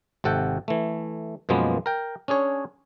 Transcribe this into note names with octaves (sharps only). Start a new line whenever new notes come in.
G#1 C3 A4 F#5 G5
E3 A3
F#2 B2 F3 G#3 A#3 B3
A#4 G5
C#4 D4 G#4 C#5